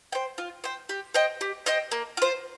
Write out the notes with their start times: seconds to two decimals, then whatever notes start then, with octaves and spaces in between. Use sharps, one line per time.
0.12 C5 G5
0.38 F4
0.64 C5 G5
0.89 G4
1.14 C5 D#5 G5
1.41 G4
1.66 C5 D#5 G5
1.92 A#3
2.17 F4 C5